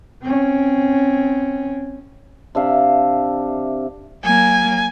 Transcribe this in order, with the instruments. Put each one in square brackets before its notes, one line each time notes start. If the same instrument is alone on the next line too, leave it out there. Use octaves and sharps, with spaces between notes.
[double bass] C4 C#4
[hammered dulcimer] C3 D4 E5 F5
[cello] F#3 A#3 [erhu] G#5